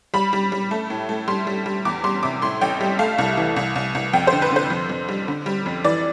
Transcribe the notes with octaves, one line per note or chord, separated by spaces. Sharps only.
G3 B5
G3
G3
A3
A2
A3
G3 C6
G3
G3
E2 D6
G3 C6
C3 D6
A2 C6
A1 G5
G3
A3 F5
C2
E3
C2
C2
C2
F2 G5
C5
D3
B4
D3 C5
F2
F2
G3
D3
G3
F2
E3 D5